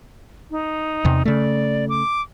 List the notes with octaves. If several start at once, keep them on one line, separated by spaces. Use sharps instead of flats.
D#4
E2 C3
C#3 A3 D5
D6